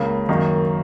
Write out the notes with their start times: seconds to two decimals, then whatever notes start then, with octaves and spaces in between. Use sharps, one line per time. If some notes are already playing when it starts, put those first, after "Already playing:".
Already playing: C#2 C#3 A#3
0.29 F#2 D#3 A#3 D#4